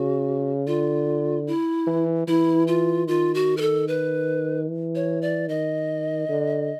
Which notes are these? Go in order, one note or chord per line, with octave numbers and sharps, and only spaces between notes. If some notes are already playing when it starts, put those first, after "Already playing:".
Already playing: C#3 F#4
D3 F4
E4
E3
E3 E4
F4
D#3 F4
F#4
A#4
A4
B4
E3
C#5
D5
D#3 D#5
D3